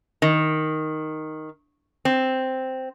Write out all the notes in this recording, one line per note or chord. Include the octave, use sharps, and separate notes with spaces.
D#3
C4